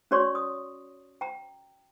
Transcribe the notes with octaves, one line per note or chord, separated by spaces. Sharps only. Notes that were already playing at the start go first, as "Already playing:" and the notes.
C#4 F#4 C#5 D5 C6 C#6
D#6
G5 A#5